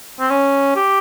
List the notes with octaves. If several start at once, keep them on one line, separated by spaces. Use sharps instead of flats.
C4
C#4
G4